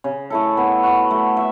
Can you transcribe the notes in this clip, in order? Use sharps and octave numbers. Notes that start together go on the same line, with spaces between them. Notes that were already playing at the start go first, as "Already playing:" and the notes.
C#3
A3 E4 A4
B3
F#4 B4
A3
E5